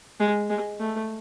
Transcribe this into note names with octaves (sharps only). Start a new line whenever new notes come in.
G#3
G#3
A3